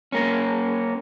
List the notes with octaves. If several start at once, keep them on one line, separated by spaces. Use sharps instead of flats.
A#3 C#4